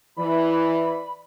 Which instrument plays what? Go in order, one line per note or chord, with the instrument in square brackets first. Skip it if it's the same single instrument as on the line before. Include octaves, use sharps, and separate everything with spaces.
[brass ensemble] E3 [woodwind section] D5 B5